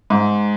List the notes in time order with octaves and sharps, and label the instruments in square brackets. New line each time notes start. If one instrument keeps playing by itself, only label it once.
[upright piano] G#2